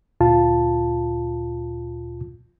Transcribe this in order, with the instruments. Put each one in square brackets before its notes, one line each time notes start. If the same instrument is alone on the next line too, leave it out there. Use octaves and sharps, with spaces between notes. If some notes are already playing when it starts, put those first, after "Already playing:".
[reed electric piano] D2 A#2 F4 A5